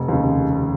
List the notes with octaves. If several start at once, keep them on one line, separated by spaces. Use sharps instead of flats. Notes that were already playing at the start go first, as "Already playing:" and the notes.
Already playing: F1
D#2 C#3